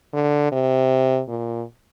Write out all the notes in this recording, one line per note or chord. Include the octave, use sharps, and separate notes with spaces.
D3
C3
A#2